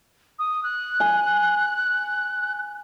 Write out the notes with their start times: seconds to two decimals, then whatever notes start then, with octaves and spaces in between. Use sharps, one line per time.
0.39 D#6
0.63 F#6
1.00 G#5